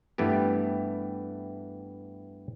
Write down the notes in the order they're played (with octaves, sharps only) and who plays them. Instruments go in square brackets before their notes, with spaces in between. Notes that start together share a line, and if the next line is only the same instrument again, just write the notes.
[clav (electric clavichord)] G2 E3 A3 B3 G4